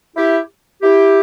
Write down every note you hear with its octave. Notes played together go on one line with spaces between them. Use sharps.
E4 G4
E4 G4